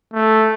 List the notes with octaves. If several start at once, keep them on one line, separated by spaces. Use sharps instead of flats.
A3